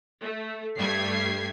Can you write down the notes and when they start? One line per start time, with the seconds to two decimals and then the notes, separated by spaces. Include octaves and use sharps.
0.22 A3
0.78 G2 G3 A3 G#6 B6 C7